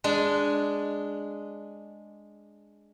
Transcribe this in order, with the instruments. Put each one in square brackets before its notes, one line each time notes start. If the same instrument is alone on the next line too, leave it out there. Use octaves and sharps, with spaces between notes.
[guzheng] G#3 D4